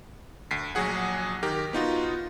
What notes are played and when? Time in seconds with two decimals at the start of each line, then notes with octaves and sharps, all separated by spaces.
0.51 D2 B6 C7
0.75 A#1 F#3 F#4 G#4 F#5
1.43 D#3 G4 A#4
1.73 B3 D#4 F4 F#4